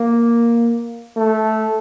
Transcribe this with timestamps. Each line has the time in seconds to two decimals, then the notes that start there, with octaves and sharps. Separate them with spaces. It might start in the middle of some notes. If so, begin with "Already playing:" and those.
Already playing: A#3
1.16 A3